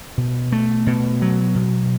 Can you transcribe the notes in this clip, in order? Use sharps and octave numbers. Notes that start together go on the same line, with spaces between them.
B2
A3
B2
F#3
B2